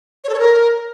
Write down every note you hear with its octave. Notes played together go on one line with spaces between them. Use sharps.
C#5
A4
C#5
A#4